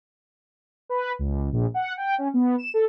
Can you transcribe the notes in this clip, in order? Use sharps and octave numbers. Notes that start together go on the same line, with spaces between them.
B4
C#2
A#1
F#5
G5
C#4
B3
E7
A4